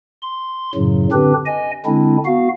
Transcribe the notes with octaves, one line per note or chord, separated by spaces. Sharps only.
C6
F#2 A2 C#3 F#3
D3 C4 D4 G4 B4
D#5 G#5
D3 G#3 C4 D4 E4
B3 F#4 F5